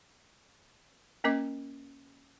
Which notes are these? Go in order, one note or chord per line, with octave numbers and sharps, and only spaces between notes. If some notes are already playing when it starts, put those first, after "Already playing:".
A#3 C#4 A#4 D#5 D6